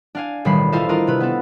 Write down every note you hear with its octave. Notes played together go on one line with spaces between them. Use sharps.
D4 F5 G#5
E1 A1 D#3 G3 B5 C7
E4 F4 A4 C5 D#5 F5
D4 F4 A#4 D#5 A#5
C3 B4
B3 A4